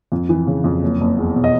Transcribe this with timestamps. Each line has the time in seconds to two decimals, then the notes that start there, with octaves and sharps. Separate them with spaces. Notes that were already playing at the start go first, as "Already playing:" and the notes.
0.12 F2
0.29 E3
0.47 C#3
0.64 F2
0.83 F#1
1.01 F#1
1.18 E2
1.35 B2
1.44 D#5